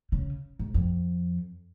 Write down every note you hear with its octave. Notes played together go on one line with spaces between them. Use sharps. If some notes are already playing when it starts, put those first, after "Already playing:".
C#3
G#2
F2